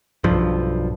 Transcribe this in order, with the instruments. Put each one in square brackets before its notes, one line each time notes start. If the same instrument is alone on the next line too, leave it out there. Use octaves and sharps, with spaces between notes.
[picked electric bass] B1 G2 F3